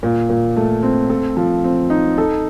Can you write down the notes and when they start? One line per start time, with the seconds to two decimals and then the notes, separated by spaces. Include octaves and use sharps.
0.03 A#2
0.30 A#2
0.56 A3
0.83 C4
1.09 A4
1.37 F3
1.64 C4
1.90 D#4
2.18 A4